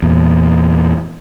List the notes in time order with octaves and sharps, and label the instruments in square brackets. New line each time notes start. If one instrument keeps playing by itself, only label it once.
[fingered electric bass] E2 A#2